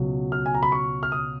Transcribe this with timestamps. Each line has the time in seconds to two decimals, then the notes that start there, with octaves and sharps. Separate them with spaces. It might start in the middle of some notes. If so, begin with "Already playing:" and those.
Already playing: C#2 B2 F#3
0.32 F6
0.46 G#5
0.54 A#5
0.63 B5
0.72 C#6
1.03 F6
1.12 D#6